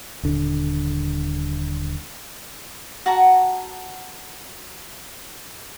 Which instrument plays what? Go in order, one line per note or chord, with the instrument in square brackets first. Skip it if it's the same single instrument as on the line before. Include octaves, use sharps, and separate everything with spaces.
[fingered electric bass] D#1 D3
[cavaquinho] F#4 F#5 A5 A#5